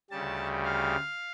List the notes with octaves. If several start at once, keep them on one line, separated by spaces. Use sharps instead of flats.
D2 C#3 G3 A5
F5